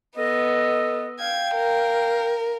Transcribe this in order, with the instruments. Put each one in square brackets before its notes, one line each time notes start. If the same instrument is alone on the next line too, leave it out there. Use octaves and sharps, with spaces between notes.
[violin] B3 [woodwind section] A4 D#5
[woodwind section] F5 G5 [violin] G#6
[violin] A#4